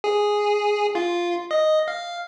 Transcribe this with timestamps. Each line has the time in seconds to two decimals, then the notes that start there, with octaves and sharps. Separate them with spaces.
0.04 G#4
0.95 F4
1.51 D#5
1.88 F5